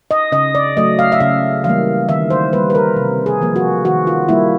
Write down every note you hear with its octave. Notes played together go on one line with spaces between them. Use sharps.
D#5
C#3 D#5
D5
F#3 A3 D#5
F5
E5
C#3 F5
E3 G3 A#3 F5
D#3 E5
C5
G3 A#3 B4
B4
A#4
C3
G#4
F3 A#3
F#4
D#3 F#4
F4
G3 A#3 E4